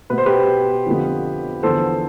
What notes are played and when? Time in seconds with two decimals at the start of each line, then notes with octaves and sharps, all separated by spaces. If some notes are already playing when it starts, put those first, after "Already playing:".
0.10 B2 B3 B4
0.18 C5
0.26 G4 B4
0.86 F2 D3 F3 B3
1.63 E2 D3 F3 B3 A4 C5